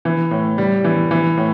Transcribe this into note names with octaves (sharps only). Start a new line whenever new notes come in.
E3
A2
G3
E3
E3
A2